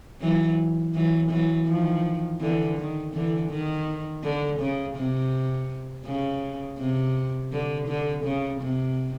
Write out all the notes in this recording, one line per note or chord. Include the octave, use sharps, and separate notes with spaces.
E3 F#3
E3 F#3
E3 F#3
D#3 F3
D3 E3
D#3
D3 E3
D#3
D3
C#3
C3
C#3
C3
D3
D3
C#3
C3